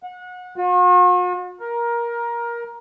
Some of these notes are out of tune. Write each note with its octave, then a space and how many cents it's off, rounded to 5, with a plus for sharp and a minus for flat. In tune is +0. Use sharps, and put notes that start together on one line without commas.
F#5 -30
F#4 -45
A#4 +15